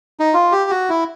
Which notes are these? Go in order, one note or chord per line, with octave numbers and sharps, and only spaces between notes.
D#4
F4
G4
F#4
E4